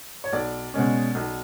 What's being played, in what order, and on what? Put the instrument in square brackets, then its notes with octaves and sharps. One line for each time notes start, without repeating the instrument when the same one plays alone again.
[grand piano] C#5
B1 D5
B2 G#3 C#4
B1